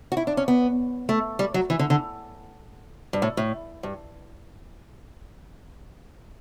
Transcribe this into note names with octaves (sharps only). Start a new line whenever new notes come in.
F#4
E4
D4
C#4
B3
A3
G3
F#3
E3
D3
D3
G2
A2
A2
G2